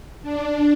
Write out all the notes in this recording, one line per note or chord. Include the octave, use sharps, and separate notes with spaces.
D4